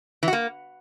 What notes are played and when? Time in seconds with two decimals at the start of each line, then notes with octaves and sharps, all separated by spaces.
0.23 E3
0.28 F#4
0.33 A#3